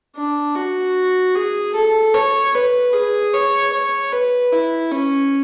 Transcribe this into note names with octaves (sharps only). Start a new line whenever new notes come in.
D4
F#4
G#4
A4
C#5
B4
G#4
C#5
C#5
B4
E4
C#4